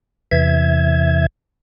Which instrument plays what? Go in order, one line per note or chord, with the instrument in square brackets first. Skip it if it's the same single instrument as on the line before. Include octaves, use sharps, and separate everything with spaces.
[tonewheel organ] E2 C3 E3 E5 G#6